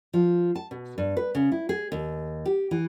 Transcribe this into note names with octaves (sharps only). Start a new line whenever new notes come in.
F3
A5
B2
G2
B4
C#3
E4
G#4
D#2
G4
E3